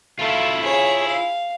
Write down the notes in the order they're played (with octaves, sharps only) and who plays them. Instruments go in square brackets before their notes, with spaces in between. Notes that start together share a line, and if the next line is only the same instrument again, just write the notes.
[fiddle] A3 [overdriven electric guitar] E4 F4
[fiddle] G#4 C#5
F5